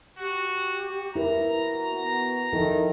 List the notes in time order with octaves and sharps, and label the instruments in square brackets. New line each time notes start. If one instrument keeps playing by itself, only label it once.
[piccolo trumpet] F#4 [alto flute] G4
[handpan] E4 A#4 B4 [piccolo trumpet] A#5
[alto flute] F#4
[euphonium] B3
[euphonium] D#3 [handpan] F3 E4 A4